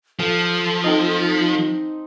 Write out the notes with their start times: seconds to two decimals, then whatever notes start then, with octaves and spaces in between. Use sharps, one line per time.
0.20 F3 A4 A5
0.84 C4 D#4 D#5